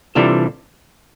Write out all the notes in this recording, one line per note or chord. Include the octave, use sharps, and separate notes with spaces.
C3 E3 G3 D4 F4 A4